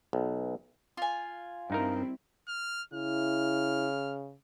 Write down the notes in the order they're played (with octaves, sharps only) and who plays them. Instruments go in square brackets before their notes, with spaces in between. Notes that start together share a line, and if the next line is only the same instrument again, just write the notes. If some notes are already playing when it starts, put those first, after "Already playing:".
[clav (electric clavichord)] B1
[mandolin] F4 G#5
[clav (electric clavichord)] G2 D#4 A#4 [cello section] G3 C4 E4
[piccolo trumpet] F6
[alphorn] C#3 [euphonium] E4 [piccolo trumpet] F6